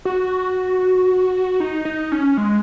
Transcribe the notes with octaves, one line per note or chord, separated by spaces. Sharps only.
F#4
D#4
D#4
C#4
G#3